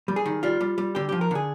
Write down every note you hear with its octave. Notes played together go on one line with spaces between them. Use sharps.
G3
G#4
D#3
G3 F4
G3
G3
D3 G4
F3 G4
A#4
D3 G#4